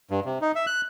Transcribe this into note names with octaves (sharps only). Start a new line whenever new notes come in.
G2
C3
D#4
E5
F#6